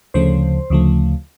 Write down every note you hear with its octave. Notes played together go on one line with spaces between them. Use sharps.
D2 C#3 F3 A3 C5
D2 C#3 F3 A3